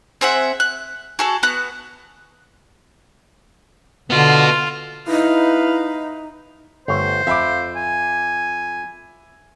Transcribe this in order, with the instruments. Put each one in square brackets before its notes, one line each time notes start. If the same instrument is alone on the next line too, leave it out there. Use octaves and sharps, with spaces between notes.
[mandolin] C4 G#4 E5 F#5
F#6
F#4 G#4 A4
B3 F#4 F#6
[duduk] D3 [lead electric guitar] B3 F#4 [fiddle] F4
[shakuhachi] D#4 [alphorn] E4 [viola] B4 F5
[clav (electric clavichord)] G1 A3 C#5 [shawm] C5
[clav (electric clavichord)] F2 [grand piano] E5 B5 D6
[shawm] G#5